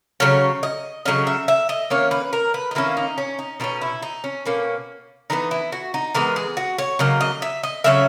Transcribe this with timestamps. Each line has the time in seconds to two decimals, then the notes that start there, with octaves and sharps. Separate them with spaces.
0.20 C#3 F#3 C#4 C#5
0.63 D#5
1.05 C#3 F#3 C#4 D#5
1.27 E5
1.48 E5
1.69 D#5
1.90 D#3 A#3 C#4 C#5
2.11 B4
2.33 A#4
2.54 B4
2.71 D#4
2.75 D#3 A#3 C#4 E4
2.97 D#4
3.18 C#4
3.39 D#4
3.60 B2 A#3 C#4 D#4
3.81 E4
4.02 D#4
4.24 C#4
4.46 B2 A#3 C#4
5.30 E3 G#3 B3 D#4
5.51 E4
5.72 F#4
5.94 D#4
6.14 E3 G#3 B3 A#4
6.36 G#4
6.57 F#4
6.78 C#5
6.99 C#3 F#3 A#3 D#5
7.21 D#5
7.42 E5
7.63 D#5
7.84 C#3 F#3 C#4 E5